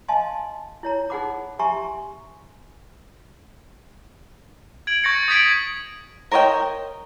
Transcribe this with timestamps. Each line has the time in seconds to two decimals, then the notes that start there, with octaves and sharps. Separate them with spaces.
0.08 D#5 F5 G#5 A5 C6
0.83 E4 C#5 A#5
1.10 D#4 G#4 C5 F#5 B5 D6
1.59 G4 E5 G#5 A#5 C6 C#6
4.87 G#6 D7 F#7
5.04 C#6 G6 A6 A#6 C#7
5.28 D#6 G6 G#6 B6 D7 F#7
6.32 A#4 C5 C#5 D#5 G5